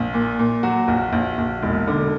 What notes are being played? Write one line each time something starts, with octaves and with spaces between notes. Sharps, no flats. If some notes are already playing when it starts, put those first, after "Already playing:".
Already playing: A#1
A#2
A#2
F#3 F#4
A#1
A#1
A#1
E1
D3